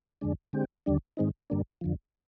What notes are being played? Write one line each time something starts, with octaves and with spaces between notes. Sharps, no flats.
F2 D3 G#3 D4
D3 G#3 C4 G4
D#2 D3 G3 D4
G#2 D#3 G#3 C4 D#4
G2 D3 G3 A#3 D4
F2 D3 F3